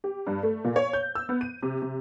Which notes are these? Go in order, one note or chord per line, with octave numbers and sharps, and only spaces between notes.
G4
G2
A3
A#2
C#5
G6
E6
B3
D#7
C3
C3